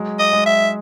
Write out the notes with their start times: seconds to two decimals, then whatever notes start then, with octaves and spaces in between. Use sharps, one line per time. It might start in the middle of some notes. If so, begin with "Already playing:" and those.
Already playing: F#3 G#3
0.19 D#5
0.33 G#3
0.46 E5